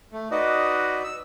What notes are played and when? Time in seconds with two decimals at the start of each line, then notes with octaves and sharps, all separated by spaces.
0.13 A3
0.31 D#4 F#4 B4 D5 D#5
1.04 E6